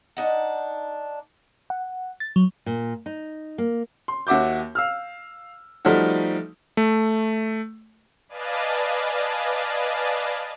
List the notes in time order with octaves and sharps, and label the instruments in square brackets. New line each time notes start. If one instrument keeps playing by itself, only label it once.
[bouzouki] D4 D#4 F#5
[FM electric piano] F#5
A6
F#3
[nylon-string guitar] A#2
D#4
A#3
[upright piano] C6
D#2 F#4 E5 D6 G6
F5 E6 F6
F3 G3 A3 D#4 F#4
[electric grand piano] A3
[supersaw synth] B4 D5 D#5 F5 G#5 A5